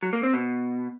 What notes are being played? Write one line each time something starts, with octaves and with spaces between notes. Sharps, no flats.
F#3
A#3
C4
B2